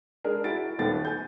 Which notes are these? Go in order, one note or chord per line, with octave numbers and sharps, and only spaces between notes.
G#3 D4 G#4 A#4
E4 F#4 A6 D7
D#1 D#2 A3 B3 A6
G#5 G6